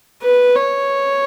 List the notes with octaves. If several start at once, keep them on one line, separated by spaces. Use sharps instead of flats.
B4
C#5